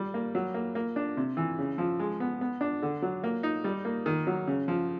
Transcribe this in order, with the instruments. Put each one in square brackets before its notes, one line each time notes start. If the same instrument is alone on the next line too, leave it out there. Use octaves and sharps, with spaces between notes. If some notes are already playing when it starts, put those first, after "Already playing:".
Already playing: [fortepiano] G3
A#3
F#3
A#3
A#3
D4
C3
E3
C#3
F3
G#3
B3
B3
D4
D3
F#3
A#3
D#4
G3
A#3
D#3
F#3
C#3
F3